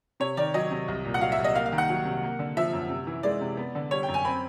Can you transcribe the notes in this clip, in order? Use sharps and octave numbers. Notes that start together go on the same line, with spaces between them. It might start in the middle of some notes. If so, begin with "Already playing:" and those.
C3 C#5
D#3 D5
F#3 D#5
C3
C2
A#2
F#5
F#3 F5
E5
C2
D#5
A#3 F5
F5
D#3
F#5
F#3
C3
A#3
D3
F3 E5
F#2
C3
E3
G#3 D5
C3
B3
D3
G3 C#5
G5
F#2
G#5
C4 B5